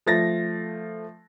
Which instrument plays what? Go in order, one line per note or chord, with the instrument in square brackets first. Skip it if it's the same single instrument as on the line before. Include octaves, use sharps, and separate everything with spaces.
[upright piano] F3 A3 A6 A#6